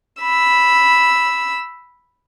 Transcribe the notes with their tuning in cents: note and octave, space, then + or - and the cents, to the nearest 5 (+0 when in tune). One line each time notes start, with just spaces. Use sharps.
B5 +0 E6 +0